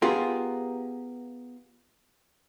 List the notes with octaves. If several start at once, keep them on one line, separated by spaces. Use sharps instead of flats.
B3 F4 G4 G#4 A#4